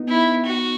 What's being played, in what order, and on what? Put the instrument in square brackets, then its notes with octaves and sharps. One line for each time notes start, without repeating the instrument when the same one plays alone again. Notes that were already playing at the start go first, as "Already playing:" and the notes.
Already playing: [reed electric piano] B3 D#4
[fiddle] E4
F#4